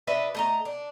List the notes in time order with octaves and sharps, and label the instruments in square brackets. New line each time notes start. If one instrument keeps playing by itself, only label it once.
[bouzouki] D4 B4 D#5 E5
A3 D#5 A#5
D4